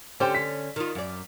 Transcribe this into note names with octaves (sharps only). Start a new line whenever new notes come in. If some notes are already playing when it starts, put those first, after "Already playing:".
D3 C#4 G4 C5 G5
B6
D#3 F4
F#2 D5